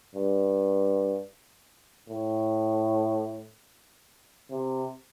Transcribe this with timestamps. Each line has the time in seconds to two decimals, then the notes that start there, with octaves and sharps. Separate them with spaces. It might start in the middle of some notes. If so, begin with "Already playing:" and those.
0.15 G2
2.09 A2
4.51 C3